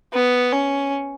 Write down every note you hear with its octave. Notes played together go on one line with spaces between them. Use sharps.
B3
C#4